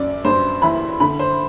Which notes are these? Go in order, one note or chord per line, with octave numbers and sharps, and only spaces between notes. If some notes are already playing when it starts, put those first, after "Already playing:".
Already playing: F#2 D5
G2 C5
E3 B5
D3 B5
C5